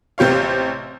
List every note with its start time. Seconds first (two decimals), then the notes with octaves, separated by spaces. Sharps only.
0.18 A1 C3 G4 C#5 F5